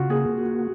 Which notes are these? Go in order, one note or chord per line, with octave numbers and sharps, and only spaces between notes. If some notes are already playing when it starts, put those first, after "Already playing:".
Already playing: C#3 F4 F#4
A#3 G#4
F#4